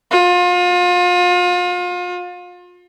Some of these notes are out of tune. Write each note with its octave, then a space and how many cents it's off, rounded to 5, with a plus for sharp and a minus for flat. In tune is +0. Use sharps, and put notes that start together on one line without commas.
F4 +35